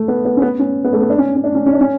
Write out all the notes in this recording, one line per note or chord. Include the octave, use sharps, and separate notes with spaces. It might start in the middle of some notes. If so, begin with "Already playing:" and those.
Already playing: A3
B3
B3
C#4
B3
C#4
B3
A3
B3
D4
C#4
C#4
D4
C#4
C#4
D4
C#4